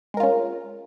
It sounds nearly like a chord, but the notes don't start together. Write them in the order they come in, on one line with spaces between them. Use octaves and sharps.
G#3 A#4 F4 C#4